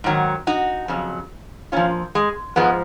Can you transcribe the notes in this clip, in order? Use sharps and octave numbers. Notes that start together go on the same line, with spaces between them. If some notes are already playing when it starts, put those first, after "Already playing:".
G#2 D#3 F#3
D#4 F#4
F2 C#3 F#3
A#2 F3 C#4 F4
G#3
G#2 F3 G#3 B3